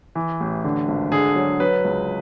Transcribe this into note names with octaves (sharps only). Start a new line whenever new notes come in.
E3
A1
D3
G#1
D3 G#4
F#3
F#3 B4
C#2